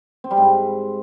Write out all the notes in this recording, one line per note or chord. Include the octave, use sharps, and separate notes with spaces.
C4
G3
G#2